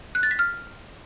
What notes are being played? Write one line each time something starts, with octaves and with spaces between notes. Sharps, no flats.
F#6
A6
B6
F6